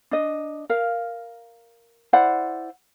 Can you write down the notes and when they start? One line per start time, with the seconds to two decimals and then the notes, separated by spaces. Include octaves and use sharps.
0.11 D4 D#5
0.69 A#4 F5
2.13 E4 C5 D5 F#5